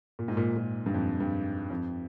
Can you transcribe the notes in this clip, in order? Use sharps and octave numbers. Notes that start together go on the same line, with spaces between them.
A#2
G#2
A#2
A#2
G2
F2
G2
F2